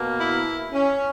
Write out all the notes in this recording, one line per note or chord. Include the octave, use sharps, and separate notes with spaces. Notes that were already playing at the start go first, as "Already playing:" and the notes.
Already playing: B2 A#3
E4
C#4